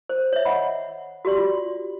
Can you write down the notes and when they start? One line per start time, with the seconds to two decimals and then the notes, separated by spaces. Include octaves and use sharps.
0.09 C5
0.32 C#5 E5
0.45 D#5 F#5 B5
1.25 F#4 G4 D5 C6
1.38 F4